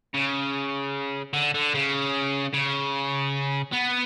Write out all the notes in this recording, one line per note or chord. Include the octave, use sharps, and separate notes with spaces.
C#3
D3
D3
C#3
C#3
B3